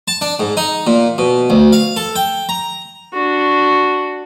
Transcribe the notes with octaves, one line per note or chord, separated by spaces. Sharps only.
A5
D4
G#2
D#4
A#2
B2
D2
F5
A4
G5
A#5
D4 F#4